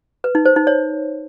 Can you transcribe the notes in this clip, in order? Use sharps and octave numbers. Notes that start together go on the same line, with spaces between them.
B4
D#4
C5
D#4
C#5